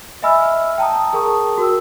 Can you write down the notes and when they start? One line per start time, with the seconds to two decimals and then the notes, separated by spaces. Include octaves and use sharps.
0.23 D#5 E5 G#5 B5 E6 F6
0.78 G5 A5 A#5 D#6
1.13 G#4 A#4 G5 A5 C#6 D#6
1.58 F#4 A#4 E6